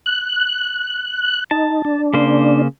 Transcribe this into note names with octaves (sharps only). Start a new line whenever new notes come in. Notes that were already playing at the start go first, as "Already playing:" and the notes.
F#6
D#4 A5
D4
C#3 A#3 C5